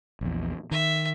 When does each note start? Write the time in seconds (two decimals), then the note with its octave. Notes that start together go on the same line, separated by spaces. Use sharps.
0.21 A#1 E2
0.71 D#3 E5